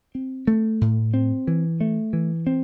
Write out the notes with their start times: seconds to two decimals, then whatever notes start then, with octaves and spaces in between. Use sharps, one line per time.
0.15 C4
0.47 A3
0.81 A2
1.14 C4
1.47 E3
1.81 A3
2.13 E3
2.47 C4